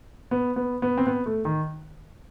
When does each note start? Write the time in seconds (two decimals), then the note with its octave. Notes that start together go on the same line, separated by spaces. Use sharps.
0.31 B3
0.56 B3
0.82 B3
0.98 C4
1.07 B3
1.26 A3
1.45 D#3